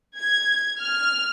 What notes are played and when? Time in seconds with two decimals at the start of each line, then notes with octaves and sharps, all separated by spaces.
0.18 G#6
0.79 F6